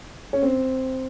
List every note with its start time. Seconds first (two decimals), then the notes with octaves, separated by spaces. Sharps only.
0.33 C#4
0.42 C4